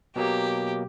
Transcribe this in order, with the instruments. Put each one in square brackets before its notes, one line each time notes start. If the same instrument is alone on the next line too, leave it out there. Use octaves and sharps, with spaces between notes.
[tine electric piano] B2 F#3 A#3 [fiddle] G4